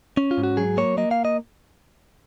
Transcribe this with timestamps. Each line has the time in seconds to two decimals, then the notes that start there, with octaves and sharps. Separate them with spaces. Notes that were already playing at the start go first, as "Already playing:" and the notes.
0.17 C#4
0.31 F4
0.38 G#2
0.43 F#4
0.57 F#3 G#4
0.77 A#3 C#5
0.97 A#3 D#5
1.11 F5
1.25 D#5